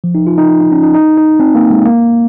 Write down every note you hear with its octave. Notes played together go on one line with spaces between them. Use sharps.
F3
D#4
F4
D#4
D#4
D#4
C#4
D#4
D#4
D#4
C4
A#3
G#3
A#3